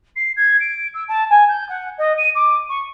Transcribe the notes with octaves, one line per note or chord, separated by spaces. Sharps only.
C7
G#6
D7
E6
A5
G#5
G6
F#5
D#5
D#7
D6
C#6